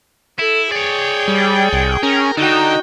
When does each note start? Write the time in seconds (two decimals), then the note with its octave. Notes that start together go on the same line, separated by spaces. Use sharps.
0.39 E4 A4
0.72 G#4 C#5 D5 G5
1.28 G3
1.73 C2
2.03 C#4 A#4
2.37 D3 D#4 F#4 G5